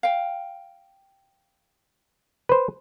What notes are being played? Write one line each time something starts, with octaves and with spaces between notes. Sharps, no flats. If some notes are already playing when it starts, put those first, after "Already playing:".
F5 G5
B4 C5